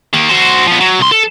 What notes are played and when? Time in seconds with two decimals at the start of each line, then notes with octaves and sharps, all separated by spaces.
0.13 D#3 A#3
0.29 F#4 C5
0.67 F3 B3
0.81 F#3
0.99 C2 C6
1.12 A4